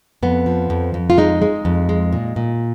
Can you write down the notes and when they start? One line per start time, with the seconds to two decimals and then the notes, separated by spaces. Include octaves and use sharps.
0.23 F2 B3
0.46 F3
0.70 F2
0.94 F2
1.10 F4
1.18 G#3 D#4
1.42 G#3
1.65 F2
1.89 G#3
2.13 A#2
2.36 A#2